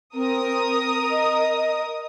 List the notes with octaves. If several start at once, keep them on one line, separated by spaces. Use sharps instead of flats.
C4 A#4 D#6
D#5